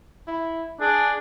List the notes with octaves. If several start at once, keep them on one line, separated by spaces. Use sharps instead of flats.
E4
D4 G#4